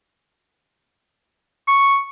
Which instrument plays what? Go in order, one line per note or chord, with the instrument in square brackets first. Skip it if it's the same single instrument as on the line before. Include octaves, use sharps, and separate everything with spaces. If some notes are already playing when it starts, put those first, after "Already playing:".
[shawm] C#6